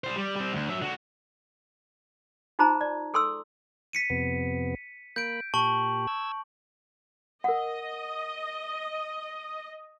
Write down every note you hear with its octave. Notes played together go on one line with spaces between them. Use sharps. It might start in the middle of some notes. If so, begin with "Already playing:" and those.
G3 C5
G3
G3 C4
D2
F#3 E5
D3 F#4
D#4 F4 G#4 C5 A5 A#5
D5
G#4 A4 C6 C#6 E6
B6 C#7 D#7
F2 C3 B3
A#3 B5 G6 D7
A#2 G4 A5 C#6 F#7
E6 G#6
A#4 D#5 F#5